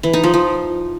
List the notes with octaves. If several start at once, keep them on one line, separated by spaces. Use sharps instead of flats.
E3
D#4
F3
F3